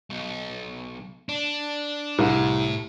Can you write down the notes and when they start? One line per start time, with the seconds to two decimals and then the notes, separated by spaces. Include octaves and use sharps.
0.11 B1
1.29 D4
2.19 C2 A2